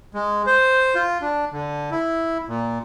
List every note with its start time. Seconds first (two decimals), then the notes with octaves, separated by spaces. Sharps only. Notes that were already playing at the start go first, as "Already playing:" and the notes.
0.14 G#3
0.46 C5
0.95 F4
1.22 D4
1.53 D3
1.91 E4
2.48 A#2